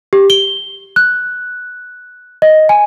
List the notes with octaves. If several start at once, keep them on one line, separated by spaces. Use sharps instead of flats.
G4
G7
F#6
D#5
G#5